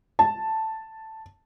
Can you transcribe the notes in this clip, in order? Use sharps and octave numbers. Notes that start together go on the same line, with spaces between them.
A5